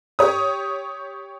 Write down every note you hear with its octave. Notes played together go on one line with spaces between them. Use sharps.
G4 C#5 D#6